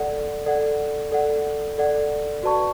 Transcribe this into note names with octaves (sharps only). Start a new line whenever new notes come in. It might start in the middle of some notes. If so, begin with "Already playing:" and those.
Already playing: A4 D5 F#5
A4 D5 F#5
A4 D5 F#5
A4 D5 F#5
F#4 B4 D5 A5 C#6